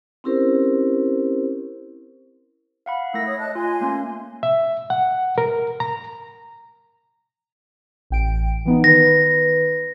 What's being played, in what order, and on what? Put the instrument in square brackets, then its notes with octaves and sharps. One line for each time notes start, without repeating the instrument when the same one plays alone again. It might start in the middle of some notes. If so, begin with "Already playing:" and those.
[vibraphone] C4 C#4 E4 G4 A#4 C5
[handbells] F5 F#5 B5
[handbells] A3 A#6 [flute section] E4 A#4 E6
[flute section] C#5 D#6
D#5 A5 F#6
[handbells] F4 [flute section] G#5 C6
[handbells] A3 A#3 C#4
[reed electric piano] E5
F#5
A#4
A#5
[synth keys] A1 G5 D7
E3 B3 D#4
[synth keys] D#3 B4 [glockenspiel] A#6